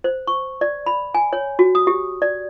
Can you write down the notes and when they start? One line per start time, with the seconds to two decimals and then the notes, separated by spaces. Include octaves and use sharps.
0.04 C5
0.27 C#6
0.61 D5
0.86 B5
1.15 G#5
1.33 C#5
1.59 F#4
1.75 D#6
1.87 G4
2.22 D5